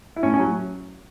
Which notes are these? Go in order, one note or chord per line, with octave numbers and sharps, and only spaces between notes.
E4
A2 C#4
C#4
F#3